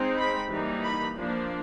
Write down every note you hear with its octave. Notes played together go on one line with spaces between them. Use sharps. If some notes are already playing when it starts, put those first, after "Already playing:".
Already playing: G#3 C4 D#4
B5
E3 G3 A#3 D#4
B5
F3 A#3 D4